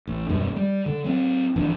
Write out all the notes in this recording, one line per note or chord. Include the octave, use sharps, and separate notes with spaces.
A1
D#1 F#2 B2 G3
G3
D3
F#3 C4
G#1 E3 F3 D4